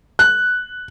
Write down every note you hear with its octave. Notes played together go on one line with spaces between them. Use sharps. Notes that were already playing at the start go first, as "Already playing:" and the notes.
F#6